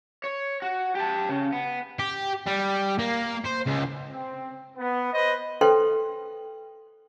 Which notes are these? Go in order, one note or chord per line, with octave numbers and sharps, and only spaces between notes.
C#5
F#4
G4 A5
C#3
B3
G4
G3
A#3
C5
C#2
C4
B3
B4 C5 D#5
A4 B4 C5 G5 C6